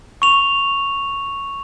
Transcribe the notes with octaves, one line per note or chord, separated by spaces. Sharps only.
C#6 F7